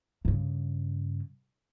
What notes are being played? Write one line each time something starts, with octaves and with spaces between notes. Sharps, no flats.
G2 C#3